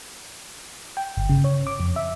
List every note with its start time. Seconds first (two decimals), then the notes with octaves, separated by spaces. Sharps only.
0.97 G5
1.17 G1
1.29 C#3
1.44 C#5
1.67 D6
1.80 F2
1.96 E5